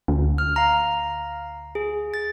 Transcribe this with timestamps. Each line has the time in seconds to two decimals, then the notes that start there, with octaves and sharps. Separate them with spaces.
0.08 D2
0.38 F6
0.56 F5 A#5
1.75 G#4
2.14 A6